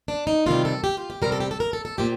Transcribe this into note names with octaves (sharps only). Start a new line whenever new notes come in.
D4
D#4
C3 D#3 G3 F4
A4
G4
F4
G4
C3 G3 A#4
A4
G4
A4
A#4
A4
A4
A#2 F3 G4